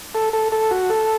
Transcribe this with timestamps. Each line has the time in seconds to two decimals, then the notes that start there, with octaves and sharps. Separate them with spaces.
0.15 A4
0.33 A4
0.52 A4
0.71 F#4
0.90 A4